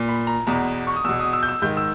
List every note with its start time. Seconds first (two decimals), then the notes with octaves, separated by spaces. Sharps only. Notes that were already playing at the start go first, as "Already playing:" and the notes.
Already playing: A#2
0.09 B5
0.27 A#5
0.47 E2 B2 A#5
0.87 C#6
0.96 D#6
1.04 E2 B2 E6
1.20 D#6
1.33 E6
1.43 G6
1.48 E6
1.62 G#2 D#3 G6
1.77 E6